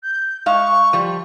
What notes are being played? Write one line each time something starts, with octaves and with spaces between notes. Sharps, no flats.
G6
G#3 F5 C#6
F3 G3